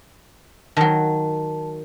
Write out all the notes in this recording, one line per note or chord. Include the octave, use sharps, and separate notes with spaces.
D#3 F#3 A5